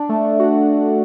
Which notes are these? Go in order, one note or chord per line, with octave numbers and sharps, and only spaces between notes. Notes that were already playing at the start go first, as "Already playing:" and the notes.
Already playing: D4
A3
A3
F#4